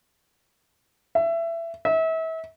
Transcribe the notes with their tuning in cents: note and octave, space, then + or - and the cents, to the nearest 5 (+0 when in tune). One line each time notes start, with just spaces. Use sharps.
E5 +20
E5 -35